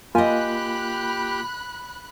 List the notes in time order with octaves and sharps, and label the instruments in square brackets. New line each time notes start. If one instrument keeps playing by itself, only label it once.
[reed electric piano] A#3 F4 [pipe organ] G4 [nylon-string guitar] D#5 G#5 [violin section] B5 F#6